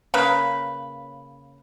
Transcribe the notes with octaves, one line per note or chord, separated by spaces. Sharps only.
C#3 A#3 B4